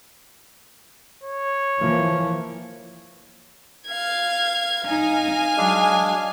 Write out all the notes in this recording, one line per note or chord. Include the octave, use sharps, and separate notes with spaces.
C#5
E3 F3 A#3
F5 G#6
D#4 F5 G#5
F#3 G#3 D4 G#4